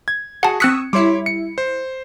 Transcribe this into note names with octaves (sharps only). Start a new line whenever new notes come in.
G#6
F#4 G#4 F#5 A5
C4 C#6 D#6 E6 F#6 B6 C#7
G3 E4 C#5 C6 D6
C#7
C5